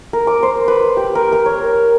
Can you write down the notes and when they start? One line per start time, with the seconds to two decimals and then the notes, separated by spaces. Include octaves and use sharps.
0.13 A#4
0.27 D6
0.43 C5
0.68 B4
0.97 G4
1.15 A#4
1.33 A#4
1.46 C#5